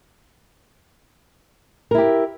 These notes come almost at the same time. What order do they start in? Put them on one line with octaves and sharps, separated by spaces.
A#4 E4 G4